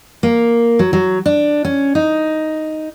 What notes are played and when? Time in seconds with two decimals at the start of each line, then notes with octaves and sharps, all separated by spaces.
0.23 A#3
0.79 F#3
0.93 F#3
1.26 D4
1.65 C#4
1.95 D#4